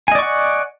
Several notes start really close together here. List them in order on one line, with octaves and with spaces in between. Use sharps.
G#5 D#5 D5 C#6 F#5